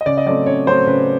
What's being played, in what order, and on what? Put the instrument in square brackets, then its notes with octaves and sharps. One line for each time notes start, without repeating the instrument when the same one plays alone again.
[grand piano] D#5
C#3 D5
D#5
F#3 A3 C4 D5
C#3 C#5
F#3 A3 C4 C5
C#3 B4